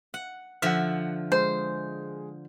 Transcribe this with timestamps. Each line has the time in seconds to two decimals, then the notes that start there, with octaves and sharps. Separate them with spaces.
0.14 F#5
0.62 D3 F3 E5 F#5 F6
1.32 G#3 C5